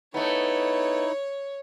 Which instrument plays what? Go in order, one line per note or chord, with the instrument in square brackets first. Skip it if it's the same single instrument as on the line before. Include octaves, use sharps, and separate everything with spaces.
[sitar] A3 B3 [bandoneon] D#4 E4 [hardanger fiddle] C#5